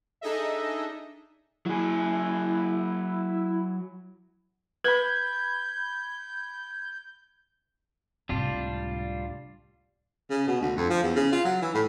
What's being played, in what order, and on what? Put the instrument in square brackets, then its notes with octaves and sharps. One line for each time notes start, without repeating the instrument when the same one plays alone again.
[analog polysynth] D4 D#4 G#4 A4 D#5 E5
[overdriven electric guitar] F#3 G#4 [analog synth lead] E4
[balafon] B4 [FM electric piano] B5 G#6 [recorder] G6
[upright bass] C#2 A2 [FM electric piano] C3 [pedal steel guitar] G3 D4 F4
[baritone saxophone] C#3
B2
D2
F2
F3
E2
C#3
F4
F#3
E3
A2